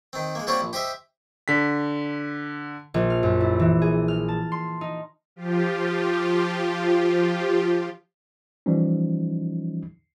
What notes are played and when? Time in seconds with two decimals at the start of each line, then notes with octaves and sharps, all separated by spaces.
0.13 D#3 C4
0.35 G#3 A#3
0.47 G3 A#3 C4 F#4 C5 C#5
0.61 A#1
0.73 G4 C5 D#5 E5
1.48 D3 B6
2.94 A#1
3.10 F6
3.23 F#2
3.41 E4
3.60 E3
3.82 G#4
4.08 F6
4.28 A5
4.52 C6
4.81 D#4
5.36 F3 F4 G4
8.66 E3 F3 G3 C#4 D#4